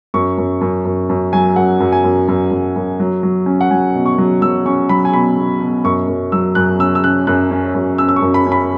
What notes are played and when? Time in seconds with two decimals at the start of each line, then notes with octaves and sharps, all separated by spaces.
0.14 F#2 C#6
0.38 F#2
0.61 F#2
0.85 F#2
1.09 F#2
1.33 F#3 G#5
1.56 F#2 F#5
1.80 F#2
1.92 G#5
2.04 F#2
2.28 F#2
2.51 F#2
2.76 F#2
3.00 F#3
3.23 F#3
3.46 C#4
3.61 F#5
3.71 F#3 G#5
3.95 B2
4.06 C#6
4.18 F#3
4.42 F#3 E6
4.66 C#4 C#6
4.89 F#3 B5
5.05 G#5
5.13 B2 B5
5.37 B2
5.60 B2
5.84 F#2 C#6
6.08 F#2
6.32 F#3 E6
6.55 F#2 F#6
6.79 C#4 E6
6.95 E6
7.04 C#4 F#6
7.27 F#2 F#6
7.51 C#4
7.74 F#2
7.98 C#4 E6
8.09 E6
8.16 C#6
8.22 F#2
8.34 B5
8.46 C#4
8.52 B5